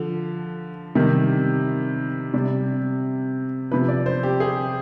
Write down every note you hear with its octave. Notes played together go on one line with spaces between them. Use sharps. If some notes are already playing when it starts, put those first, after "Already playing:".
Already playing: D3 F3
C3 D#3 G3
C3 G3 D5
C3 F3 B4
D5
C5
G4
G#4